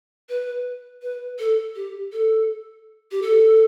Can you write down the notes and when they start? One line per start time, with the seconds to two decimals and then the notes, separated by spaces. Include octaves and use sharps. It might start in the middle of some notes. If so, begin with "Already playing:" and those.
0.29 B4
1.02 B4
1.39 A4
1.76 G4
2.12 A4
3.11 G4
3.22 A4